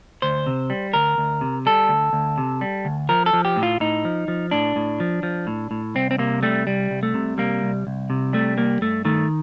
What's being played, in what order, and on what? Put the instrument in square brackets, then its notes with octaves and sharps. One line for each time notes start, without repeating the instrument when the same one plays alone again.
[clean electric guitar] D2 C5
C3
G3
D2 A#4
D2
C3
G3 A4
D2
D2
C3
G3
D2
F3 A#4
A4
F3
G4
A2
F4
A2 D#4
F3
F3
A2 D4
A2
F3
F3
A2
A2
C2 C4
C4
C3 A#3
G3 A3
C2 G3
C2
A3
C3
G3 A#3
C2
C2
C3
G3 A3
C2 A#3
G2 A3
D#3 A3